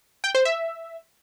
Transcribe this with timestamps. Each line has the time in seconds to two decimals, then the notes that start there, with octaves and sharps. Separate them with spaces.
0.24 G5
0.35 C5
0.45 E5